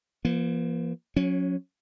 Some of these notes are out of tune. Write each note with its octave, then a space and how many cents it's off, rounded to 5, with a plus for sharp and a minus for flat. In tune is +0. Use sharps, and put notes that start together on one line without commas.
F3 -40 A#3 +30
F#3 -35 C#4 +0